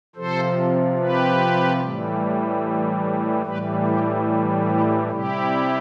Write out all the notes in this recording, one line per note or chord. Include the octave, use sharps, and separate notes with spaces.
C3 F3 A4 C5
G4 B4
A2 E3 G3
A2 E3 G3 G4 B4
E4 G4
E4 G4
C3 G3 E4 G4